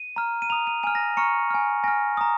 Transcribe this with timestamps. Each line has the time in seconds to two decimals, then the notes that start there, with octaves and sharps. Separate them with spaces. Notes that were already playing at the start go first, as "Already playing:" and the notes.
Already playing: D#7
0.16 A#5 F6
0.42 D#7
0.50 A#5 D#6 F7
0.67 D#7
0.83 G#5 F6 D#7
0.95 A#6
1.17 A#5 C#6 F6 C#7
1.50 G#5 F6
1.84 G#5 F6 A#6
2.17 A#5 D#6